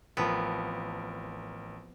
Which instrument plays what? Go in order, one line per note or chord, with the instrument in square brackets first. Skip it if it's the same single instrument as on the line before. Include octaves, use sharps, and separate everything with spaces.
[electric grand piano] A1 A#4 [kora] F3 C4 [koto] B3